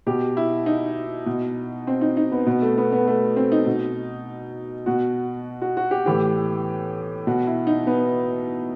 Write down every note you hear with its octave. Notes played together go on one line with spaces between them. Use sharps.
B2 G4
E4
D#4
B2
C4
D#4
D#4
B3
B2 B3
A3
B3
B3
A3
C4
D#4
B2
B2 F#4
F#4
F#4
G4
A2 E3 G4
B2 F#4
E4
D#4
B3